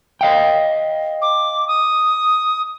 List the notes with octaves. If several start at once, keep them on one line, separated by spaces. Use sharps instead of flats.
D#5 F5 G5
D6
D#6